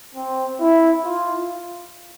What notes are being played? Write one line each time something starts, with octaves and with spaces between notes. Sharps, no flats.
C4
E4
F4